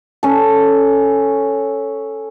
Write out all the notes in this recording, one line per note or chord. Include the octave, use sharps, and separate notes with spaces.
C#4 A4